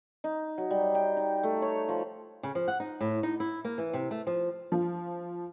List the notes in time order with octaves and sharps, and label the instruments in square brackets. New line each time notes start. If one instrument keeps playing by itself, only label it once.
[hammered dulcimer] D#4
F#3
G3
G5
D#4
A3
C#5
F3
[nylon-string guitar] C#3
F3
F#5
D#4
A2
D#4
E4
A#3
E3
C3
A3
F3
[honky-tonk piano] F3